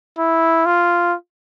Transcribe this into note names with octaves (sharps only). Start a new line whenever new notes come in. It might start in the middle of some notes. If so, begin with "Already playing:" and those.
E4
F4